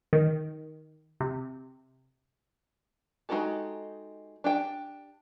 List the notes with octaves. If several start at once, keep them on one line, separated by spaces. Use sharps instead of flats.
D#3
C3
G#3 D#4 F#4 G4 A4
D4 G4 G5